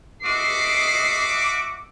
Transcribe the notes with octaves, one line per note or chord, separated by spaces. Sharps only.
F#4 D#5 E5 D6 C7